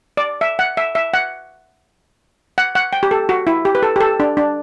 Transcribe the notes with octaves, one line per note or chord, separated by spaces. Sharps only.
D5
E5
F#5
E5
E5
F#5
F#5
F#5
G5
G4
A4
F#4
E4
G4
B4
A4
G4
A4
D4
D4